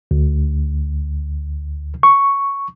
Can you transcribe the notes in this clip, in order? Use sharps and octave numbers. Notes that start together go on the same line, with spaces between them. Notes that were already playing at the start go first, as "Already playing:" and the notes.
D2
C#6